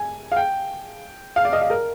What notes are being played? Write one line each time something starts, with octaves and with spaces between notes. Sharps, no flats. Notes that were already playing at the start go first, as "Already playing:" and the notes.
Already playing: G#5
F5
G5
F5
D5
D#5
F5
A#4